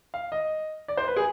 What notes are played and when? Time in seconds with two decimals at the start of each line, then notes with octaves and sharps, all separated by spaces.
0.14 F5
0.32 D#5
0.88 D5
0.97 C5
1.07 B4
1.16 G#4